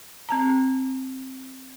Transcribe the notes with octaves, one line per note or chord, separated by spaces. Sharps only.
C4 A5 A#5